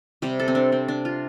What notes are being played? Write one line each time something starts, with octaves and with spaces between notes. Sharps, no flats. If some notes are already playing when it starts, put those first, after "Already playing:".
C3 G3 G4
A4
C4
D4
C4
D4
F4